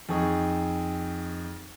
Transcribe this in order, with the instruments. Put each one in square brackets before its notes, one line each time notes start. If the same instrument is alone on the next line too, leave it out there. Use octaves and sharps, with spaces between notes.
[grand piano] F2 D#4 G#4 C#6